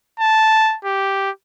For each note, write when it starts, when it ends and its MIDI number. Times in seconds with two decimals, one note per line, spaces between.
0.20 0.76 81
0.85 1.30 67